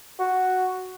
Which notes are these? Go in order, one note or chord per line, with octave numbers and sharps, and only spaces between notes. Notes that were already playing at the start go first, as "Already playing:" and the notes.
F#4